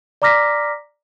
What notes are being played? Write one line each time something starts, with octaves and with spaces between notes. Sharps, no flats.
D5 A#5 D6 F6 A#6 B6